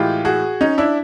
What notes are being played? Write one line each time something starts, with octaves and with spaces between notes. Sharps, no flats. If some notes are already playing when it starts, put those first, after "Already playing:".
Already playing: A2 E3 G#3 F4 G4
F#4 G#4
C#4 D#4
D4 E4